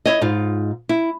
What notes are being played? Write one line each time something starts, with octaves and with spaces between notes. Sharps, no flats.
E4 C#5 D#5
G#2 D#4 F4
E4